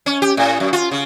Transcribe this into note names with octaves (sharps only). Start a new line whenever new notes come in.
C#4
G4
A2
F#2
F4
C#3